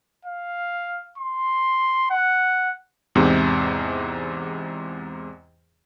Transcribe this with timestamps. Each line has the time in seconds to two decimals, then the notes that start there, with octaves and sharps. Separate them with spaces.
0.25 F5
1.18 C6
2.10 F#5
3.15 E2 G#2 C3